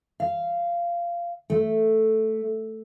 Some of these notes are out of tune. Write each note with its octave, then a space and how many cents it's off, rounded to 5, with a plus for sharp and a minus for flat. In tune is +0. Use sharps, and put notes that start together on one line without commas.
F5 -15
A3 +0